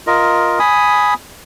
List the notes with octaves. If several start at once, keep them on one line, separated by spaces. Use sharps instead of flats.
F4 A#4 D#5
G#5 B5 D#6